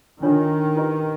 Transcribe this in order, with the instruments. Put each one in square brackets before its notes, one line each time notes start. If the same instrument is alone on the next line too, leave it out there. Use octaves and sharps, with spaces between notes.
[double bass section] D#3 [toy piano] D4 F4 A4 C#5
[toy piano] E4 G4 B4 D#5 G5